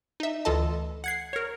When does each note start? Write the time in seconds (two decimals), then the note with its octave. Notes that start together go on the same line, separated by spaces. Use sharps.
0.20 D#4 E5
0.45 D2 E3 F4 A4 D#5 A5
1.04 F#5 G#6 C7
1.33 A#4 C#5